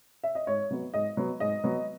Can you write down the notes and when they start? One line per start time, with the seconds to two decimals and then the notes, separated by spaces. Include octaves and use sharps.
0.23 E5
0.35 D#5
0.47 G#2 C#5
0.71 F#3 B3
0.94 G#2 D#5
1.17 F#3 B3
1.40 G#2 D#5
1.64 F#3 B3